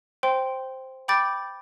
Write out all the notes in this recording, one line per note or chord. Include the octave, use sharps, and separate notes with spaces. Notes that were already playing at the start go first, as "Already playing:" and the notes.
C5 G5 C6
G5 B5 D6 G6 A6 D7